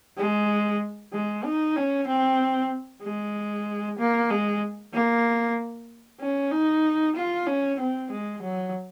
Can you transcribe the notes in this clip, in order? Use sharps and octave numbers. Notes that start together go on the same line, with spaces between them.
G#3
G#3
D#4
C#4
C4
G#3
A#3
G#3
A#3
C#4
D#4
F4
C#4
C4
G#3
F#3